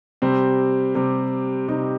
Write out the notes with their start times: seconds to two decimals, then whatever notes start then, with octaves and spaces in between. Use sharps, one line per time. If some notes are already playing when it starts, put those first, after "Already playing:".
0.22 C3 G3 C4
0.95 C3 G3
1.68 C3 G3 D#4